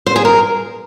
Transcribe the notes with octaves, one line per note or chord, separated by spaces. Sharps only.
C5
G#4
A#4